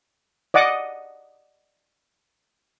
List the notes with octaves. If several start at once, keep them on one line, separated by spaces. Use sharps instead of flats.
D5 D#5 F#5 D6 D#6